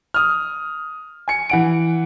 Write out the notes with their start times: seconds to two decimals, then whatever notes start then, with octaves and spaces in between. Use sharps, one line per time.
0.14 D#6 F6
1.28 G#5 C#7
1.50 E3 F#5 D7